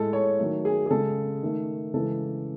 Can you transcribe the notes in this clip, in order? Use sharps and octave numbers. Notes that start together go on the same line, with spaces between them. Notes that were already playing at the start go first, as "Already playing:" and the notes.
Already playing: A2 G#3 A4
C#5
D#3 F#3 A3
G#4
G#4
C#3 G#3 A4
D#3 A3
C#3 E3 G#3 A4